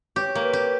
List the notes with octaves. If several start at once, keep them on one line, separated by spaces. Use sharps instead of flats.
G4 C#5
A#3
B4
G4